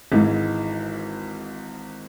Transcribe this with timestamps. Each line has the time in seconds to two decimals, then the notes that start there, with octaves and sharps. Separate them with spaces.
0.12 G#1 G#2 E3 G#3